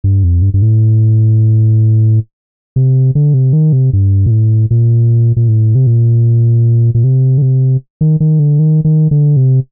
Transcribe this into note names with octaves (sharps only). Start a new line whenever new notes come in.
G2
F2
G2
G2
A2
C3
D3
C3
D#3
C3
G2
A#2
A2
A#2
A#2
A2
C3
A#2
A#2
C3
D3
C3
D#3
D#3
D3
D#3
D#3
D3
C3